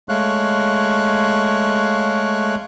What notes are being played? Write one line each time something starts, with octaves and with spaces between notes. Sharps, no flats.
G#3 A3 C#5 F5 F#6